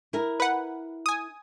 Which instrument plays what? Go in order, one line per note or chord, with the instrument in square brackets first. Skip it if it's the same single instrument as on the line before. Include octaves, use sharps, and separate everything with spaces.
[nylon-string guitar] E4 A#4
[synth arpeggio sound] B4 F#5
G#5 D#6